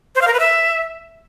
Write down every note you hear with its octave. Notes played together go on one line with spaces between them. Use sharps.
C5
F5
A#4
B4
E5